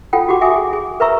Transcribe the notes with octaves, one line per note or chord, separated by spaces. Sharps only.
F4 A4 F#5 G5
F#4 G4 F#5 D6
E5 F#5 G#5 D6 D#6
G#4
G#4
A#4 B4 E5 A#5 C#6 E6